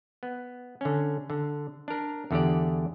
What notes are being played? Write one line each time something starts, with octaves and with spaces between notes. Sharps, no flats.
B3
D3 C#4
D3
D4 A#4
E2 D3 G4 D5